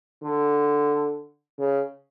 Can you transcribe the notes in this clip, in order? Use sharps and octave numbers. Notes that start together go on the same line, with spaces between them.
D3
C#3